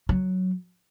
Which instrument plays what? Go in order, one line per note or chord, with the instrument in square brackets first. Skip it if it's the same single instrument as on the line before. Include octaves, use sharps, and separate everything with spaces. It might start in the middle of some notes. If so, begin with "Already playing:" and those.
[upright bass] F#3